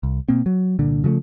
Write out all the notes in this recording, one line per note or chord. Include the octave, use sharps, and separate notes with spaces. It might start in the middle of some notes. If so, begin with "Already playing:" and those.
C2
B2 A#3 C4
F#3
C2 A#2 D3
C#3 F3 F#3 A3